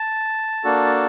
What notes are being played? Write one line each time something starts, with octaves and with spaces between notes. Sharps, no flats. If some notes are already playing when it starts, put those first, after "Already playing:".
Already playing: A5
A#3 D4 F#4 A4